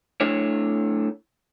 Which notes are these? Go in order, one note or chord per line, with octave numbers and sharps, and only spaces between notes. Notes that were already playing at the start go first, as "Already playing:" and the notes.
A3 D4 E4 C#5